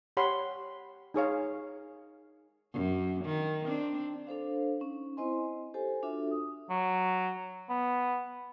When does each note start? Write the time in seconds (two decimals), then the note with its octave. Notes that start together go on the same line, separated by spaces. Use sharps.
0.17 G4 C#5 F#5 B5 C6
1.14 D#4 G#4 C#5 F5
2.73 F#2
3.25 D#3
3.64 C4 D4
4.27 D4 A4 C5 F5
4.80 C#4 D#4
5.17 C4 E4 C5 D#5 G#5 C6
5.74 G4 A4 C5 G#5
6.03 D4 F4 F#4 A4 E5
6.31 D#6
6.70 F#3
7.69 B3